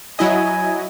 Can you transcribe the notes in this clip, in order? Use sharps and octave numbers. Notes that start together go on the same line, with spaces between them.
F#3 E4 D#5 G#5